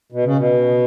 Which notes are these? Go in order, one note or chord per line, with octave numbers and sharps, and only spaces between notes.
B2
C#3
B2